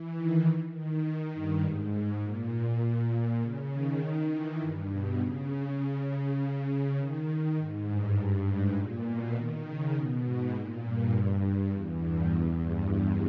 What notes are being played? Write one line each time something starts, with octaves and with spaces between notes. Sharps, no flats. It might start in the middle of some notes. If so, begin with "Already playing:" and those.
Already playing: E3
D#3
D#3
G2
G#2
A#2
C#3
D#3
E3
G2
B2
C#3
C#3
D#3
D#3
G#2
G2
G2
G#2
A#2
B2
D#3
C#3
B2
G#2
A#2
G2
G2
E2
G2
E2
G2